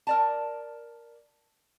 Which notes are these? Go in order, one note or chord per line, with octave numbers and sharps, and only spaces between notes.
A#4 D5 A5